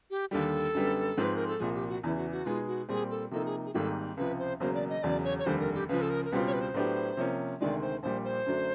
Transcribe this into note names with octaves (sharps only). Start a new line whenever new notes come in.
G4
D#2 D3 G3 A4
F#2 D3 G3 B3
G#2 F3 G#3 C4
B4
A#4
A4
C2 A#2 F3 G#4
G4
F#4
E2 C#3 E3 E4
F#4
F#4
B2 G#3 B3 D#4 F4 G#4
F#4
A#2 G3 C4 G#4
A4
C3 F3 A#3 D#4 A4
G#4
G#4
G#1 G#2 D#3 G3 A#3 A4
C#2 C3 F3 B4
C5
E1 E2 C#3 F#3 A#3 C5
D5
D#5
E1 E2 C#3 F#3 D5
C#5
C#5
F1 D#2 D3 G3 C5
A#4
G4
C#2 C#3 F3 B4
A4
A#4
A#4
C#2 B2 G3 C4 F4 B4
C#5
B4
C5
A2 F#3 B3 D4 G4
C3 F3 A#3 C#4
D2 C3 D#3 G#3 D5
C5
A#1 A#2 G3 C5
C5
F#2 D3 F#3 A3 D4